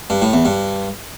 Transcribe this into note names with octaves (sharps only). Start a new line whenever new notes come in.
G2
A2
E2
G2